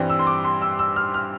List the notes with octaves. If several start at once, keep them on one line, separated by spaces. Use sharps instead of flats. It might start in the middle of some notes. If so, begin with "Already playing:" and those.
Already playing: G2 E3 G3 C4
E6
C6
D6
C6
E6
E6
F6
F6